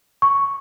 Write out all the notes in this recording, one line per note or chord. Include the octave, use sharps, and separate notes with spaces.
C#6